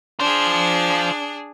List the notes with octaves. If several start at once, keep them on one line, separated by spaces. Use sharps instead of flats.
D4 F4 G#4 C5